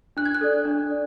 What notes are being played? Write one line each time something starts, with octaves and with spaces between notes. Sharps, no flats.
D4 F#6
G#6
F#6
A4 D5
D4
D5